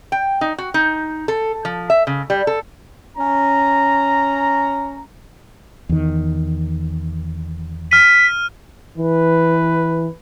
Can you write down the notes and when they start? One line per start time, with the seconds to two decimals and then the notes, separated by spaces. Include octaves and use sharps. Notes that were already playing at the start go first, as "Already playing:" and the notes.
0.12 G5
0.41 D#4
0.58 F#4
0.74 D#4
1.28 A4
1.65 F3
1.90 E5
2.07 C#3
2.30 G3
2.47 A4
3.17 C#4 A#5
5.89 E2 D#3
7.91 F6 B6 D#7
8.98 E3 B4